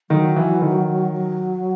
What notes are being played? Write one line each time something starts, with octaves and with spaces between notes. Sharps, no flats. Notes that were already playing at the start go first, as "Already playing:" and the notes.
D#3 F#3
E3
D#3
F#3